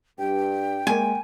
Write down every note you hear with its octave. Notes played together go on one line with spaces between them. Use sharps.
G2 G5
G#3 A#3 G#5